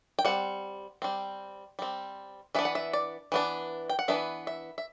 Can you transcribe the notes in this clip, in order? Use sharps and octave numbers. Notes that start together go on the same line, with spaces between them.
G5
G3 C4 F#5
G3 C4
G3 C4
E3 B3 D4 E5
F#5
E5
D5
E3 B3 D4
G5
F#5
E3 B3 D4 E5
E5
E5